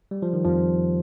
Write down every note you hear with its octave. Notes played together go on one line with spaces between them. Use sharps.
G3
F3
D#3
F2 F3